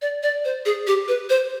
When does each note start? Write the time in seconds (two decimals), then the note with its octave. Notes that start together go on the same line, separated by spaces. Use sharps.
0.02 D5
0.23 D5
0.45 C5
0.65 G#4
0.87 G4
1.08 B4
1.30 C5